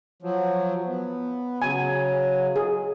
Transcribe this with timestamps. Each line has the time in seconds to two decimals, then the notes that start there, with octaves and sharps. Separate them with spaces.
0.22 F3 F#3
0.87 B3
1.62 C#3 F#3 G#5
2.56 G#4